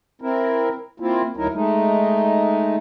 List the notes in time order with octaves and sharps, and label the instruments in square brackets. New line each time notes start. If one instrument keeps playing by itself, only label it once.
[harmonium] C4 E4 A#4
A#3 C4 E4 F4
D2 F#3 D#4 E4 A#4
G#3 A3 D#4